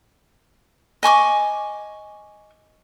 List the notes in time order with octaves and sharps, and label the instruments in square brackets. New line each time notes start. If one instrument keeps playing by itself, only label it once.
[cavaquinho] D#5 G#5 C#6 D6